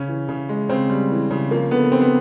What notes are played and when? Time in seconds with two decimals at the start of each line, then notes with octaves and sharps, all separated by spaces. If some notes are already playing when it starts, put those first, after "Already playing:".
Already playing: C#3 C#4
0.08 E3
0.29 C#3
0.49 G#3
0.69 C#3 C4
0.89 G3
1.11 E3
1.31 C#3
1.51 F3 A#3
1.71 D3 B3
1.92 D3 C4
2.01 B3